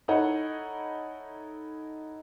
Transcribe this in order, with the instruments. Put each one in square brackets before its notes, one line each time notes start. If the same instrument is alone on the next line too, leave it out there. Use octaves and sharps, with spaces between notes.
[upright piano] D#4 E4 A4 C#5 D#5 F#5